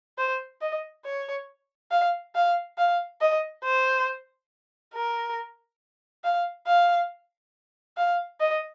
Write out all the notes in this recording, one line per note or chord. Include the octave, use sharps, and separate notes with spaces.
C5
D#5
C#5
F5
F5
F5
D#5
C5
A#4
F5
F5
F5
D#5